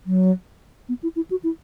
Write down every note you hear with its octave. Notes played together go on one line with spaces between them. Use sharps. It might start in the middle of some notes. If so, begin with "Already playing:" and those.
F#3
B3
E4
E4
F#4
E4